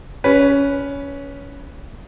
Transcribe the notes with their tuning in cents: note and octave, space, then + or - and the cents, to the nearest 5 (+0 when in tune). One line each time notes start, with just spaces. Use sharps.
C#4 +15 B4 +0